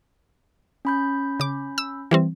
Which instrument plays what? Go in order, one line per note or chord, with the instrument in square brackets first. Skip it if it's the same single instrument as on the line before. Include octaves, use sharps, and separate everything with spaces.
[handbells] C#4 B5 G6
[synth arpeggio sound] C#3 D6
E6
E3 G3 C4